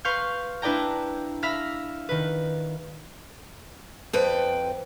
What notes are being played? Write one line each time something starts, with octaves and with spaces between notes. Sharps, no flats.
B4 F5 C6 C#6 F6 G6
D4 E4 B4 D5 G5 A#5
E5 F5 B5 F6 A#6 B6
D#3 B4
F2 F3 B4 G5